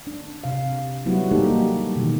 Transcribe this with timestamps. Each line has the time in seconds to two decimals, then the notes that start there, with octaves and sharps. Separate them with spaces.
0.07 D4
0.44 C3 F5
1.06 F#3 G3 B3 E4 F#4
1.31 G3 A#3 D#4 G4 A4
1.96 B2 D#3 E3